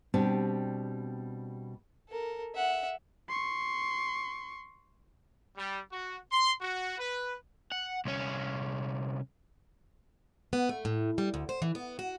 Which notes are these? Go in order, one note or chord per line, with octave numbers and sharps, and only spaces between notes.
B2 G3 C4 D4 G4
A4 A#4
E5 F#5
C6 C#6
G3
F#4
C6
F#4
B4
F#5
C2 C#4
B3
A3
A2
G3
D2
C5
E3
B3
F#4